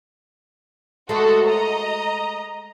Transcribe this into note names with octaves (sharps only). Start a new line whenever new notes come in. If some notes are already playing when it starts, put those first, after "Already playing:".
G#3 A3 F#4 A4
D#5 A#5